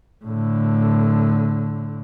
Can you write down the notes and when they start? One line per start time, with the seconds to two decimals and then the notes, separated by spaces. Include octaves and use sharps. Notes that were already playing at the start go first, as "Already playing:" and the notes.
0.24 A2 D3